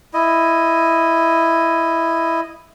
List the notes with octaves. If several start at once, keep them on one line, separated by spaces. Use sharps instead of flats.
E4 D#5